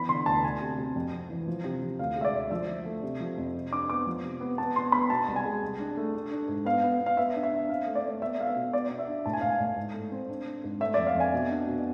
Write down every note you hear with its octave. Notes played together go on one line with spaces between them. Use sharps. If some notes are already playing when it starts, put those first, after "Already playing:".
Already playing: E3 B3 B5
D3 C6
D2 A5
D2 G#5
C3
C3
F2
F2
E3
F3
C3
F3
D2 F5
G#3
E5
D5
D2
F3 E5
F3
A3
C3
F3
F2
C3
D4 D6
B3 D6
F3
C3
B3
B3 A5
B3 C6
B3 B5
B2 A5
C2
G#5
G#3
C2
D4
A3
D4
D4
G#2
B3 F5
B3
B3
F5
B3 E5
D4
E5
D4
C4 F5
A3
D5
A3
B3 E5
B3 F5
E5
B2
B3 D5
B2
E5
D4
A2 A5
G#5
A2 F5
G#5
A2
G#2
A3
C4
D4
D4
G#2
A3 E5
F2 D5
F5
F2
G#5
B2
D4
B2